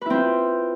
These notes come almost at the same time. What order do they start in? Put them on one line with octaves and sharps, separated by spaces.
B4 E4 C4 F4